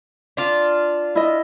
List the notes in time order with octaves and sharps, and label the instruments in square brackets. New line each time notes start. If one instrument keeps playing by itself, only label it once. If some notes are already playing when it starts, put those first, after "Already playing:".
[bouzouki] D4 F4
[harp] E4 D#5